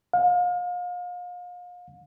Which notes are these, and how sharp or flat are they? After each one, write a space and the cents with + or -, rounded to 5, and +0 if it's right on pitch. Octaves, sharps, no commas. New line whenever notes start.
F5 +35